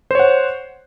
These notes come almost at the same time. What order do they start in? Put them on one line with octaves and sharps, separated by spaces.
C5 C#5 F#5